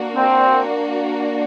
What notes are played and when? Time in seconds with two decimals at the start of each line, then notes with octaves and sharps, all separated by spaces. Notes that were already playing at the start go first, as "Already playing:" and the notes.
Already playing: A#3 D4 F#4
0.16 C4